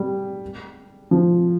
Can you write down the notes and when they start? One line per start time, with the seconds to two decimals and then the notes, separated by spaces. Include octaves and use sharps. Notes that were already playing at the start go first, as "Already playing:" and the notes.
Already playing: G3
1.11 F3